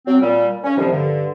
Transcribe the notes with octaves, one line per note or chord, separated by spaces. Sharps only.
F#3 C4
A#2 G3
C#4
A2 C3 D#3 F3 G3
G2 D3